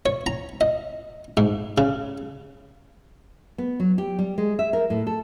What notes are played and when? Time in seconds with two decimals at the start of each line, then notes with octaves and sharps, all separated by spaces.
0.06 C#5
0.26 A#5
0.61 D#5
1.37 G#2
1.78 C#3
3.58 B3
3.80 F#3
3.98 G4
4.19 G3
4.38 G#3
4.59 E5
4.73 A#4
4.90 A2
5.07 A4